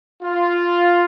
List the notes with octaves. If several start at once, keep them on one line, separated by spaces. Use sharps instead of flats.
F4